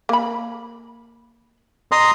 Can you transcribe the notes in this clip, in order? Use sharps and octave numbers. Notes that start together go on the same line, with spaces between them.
A#3 B5
D#5 A#5 C6 D#6